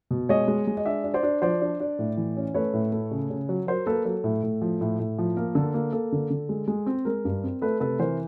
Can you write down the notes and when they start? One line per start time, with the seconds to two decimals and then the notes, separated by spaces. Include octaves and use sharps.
0.11 B2
0.29 G#3 C#5 D#5
0.48 G#3
0.67 G#3
0.77 D#5
0.85 D4 D5 E5
1.04 D4
1.14 C5 D5
1.23 D4
1.42 F3 C5 D5
1.62 D4
1.80 D4
1.99 A2
2.17 E3
2.37 C#4
2.54 A3 B4 C#5
2.74 A2
2.92 A3
3.11 C#3
3.30 C#3
3.49 F#3
3.67 F#3 A#4 C5
3.86 A#3 A4 B4
4.05 F#3 A4
4.24 A2
4.43 A2
4.62 F3
4.81 A2
5.00 A2
5.19 F3
5.37 A#3 A#4
5.55 D3 A4
5.74 A#3
5.92 A#3 A4
6.12 D3
6.30 D3
6.49 G#3
6.68 G#3
6.86 C4
7.05 G#3 A#4
7.25 G2
7.43 C4
7.61 A3 A4 B4
7.80 C3 A4 B4
7.99 E3 A#4 C5